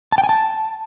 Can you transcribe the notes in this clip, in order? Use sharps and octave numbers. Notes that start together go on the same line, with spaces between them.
A5
G5
G#5
A5